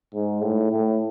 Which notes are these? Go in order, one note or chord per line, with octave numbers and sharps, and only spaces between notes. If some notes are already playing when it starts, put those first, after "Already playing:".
G#2
A2
A2